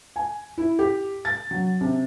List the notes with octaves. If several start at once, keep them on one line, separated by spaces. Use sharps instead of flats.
G#5
E4
G4
A6
F#3
C3